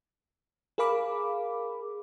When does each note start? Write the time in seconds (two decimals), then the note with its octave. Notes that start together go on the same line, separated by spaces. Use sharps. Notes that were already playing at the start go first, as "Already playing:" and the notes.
0.78 G#4 A#4 F5 B5 D6